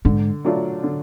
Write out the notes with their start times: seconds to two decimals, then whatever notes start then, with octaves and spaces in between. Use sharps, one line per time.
0.05 G#2 D3
0.45 F#3 A3 D4 F4
0.83 D3